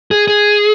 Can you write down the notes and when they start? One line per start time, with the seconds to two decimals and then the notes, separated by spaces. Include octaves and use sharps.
0.11 G#4
0.28 G#4